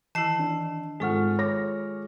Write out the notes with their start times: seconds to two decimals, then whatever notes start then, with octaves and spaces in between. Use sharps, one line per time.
0.15 D#3 E3 E4 A5 C7
0.39 D4
1.00 G#1 G#3 F4 G#4 A4 F#5 C#6 F6
1.38 C#5 D6 A#6